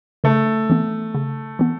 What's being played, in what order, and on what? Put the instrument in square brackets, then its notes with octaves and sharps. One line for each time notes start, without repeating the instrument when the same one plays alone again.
[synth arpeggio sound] C#3 [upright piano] A3
[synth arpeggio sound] E3 B3
C#3
E3 B3